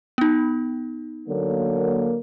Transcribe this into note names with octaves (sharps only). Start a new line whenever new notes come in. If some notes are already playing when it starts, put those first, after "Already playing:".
B3 D#4
D3 F#3 A#3